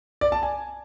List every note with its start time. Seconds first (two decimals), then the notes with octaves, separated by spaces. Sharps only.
0.21 D5
0.32 A5
0.43 G#5